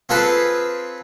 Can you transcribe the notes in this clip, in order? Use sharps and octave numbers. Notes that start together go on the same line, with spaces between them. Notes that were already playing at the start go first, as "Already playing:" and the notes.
C4 F4 G#4 A4 B4 A5